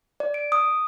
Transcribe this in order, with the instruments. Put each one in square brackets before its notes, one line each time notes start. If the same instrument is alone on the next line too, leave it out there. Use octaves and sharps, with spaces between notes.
[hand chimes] D5
D7
D#6